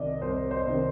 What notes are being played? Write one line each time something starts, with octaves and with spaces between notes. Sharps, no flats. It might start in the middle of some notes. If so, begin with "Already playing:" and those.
Already playing: C2 C3 D#3 D5 D#5
C2 C5
C5
C3 D#3